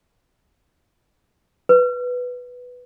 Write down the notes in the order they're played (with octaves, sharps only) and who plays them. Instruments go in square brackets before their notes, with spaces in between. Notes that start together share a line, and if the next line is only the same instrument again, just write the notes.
[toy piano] B4